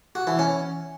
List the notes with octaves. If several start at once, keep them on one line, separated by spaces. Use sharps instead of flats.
F#4
E3
C#4